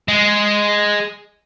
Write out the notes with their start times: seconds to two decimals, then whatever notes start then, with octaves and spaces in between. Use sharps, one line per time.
0.08 G#3